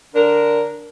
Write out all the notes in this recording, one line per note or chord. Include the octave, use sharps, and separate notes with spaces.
D3 D4 A#4